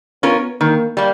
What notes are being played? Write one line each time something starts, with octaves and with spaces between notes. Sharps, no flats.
B3 C#4 F4 A#4
D#3 A#3
G3 A#3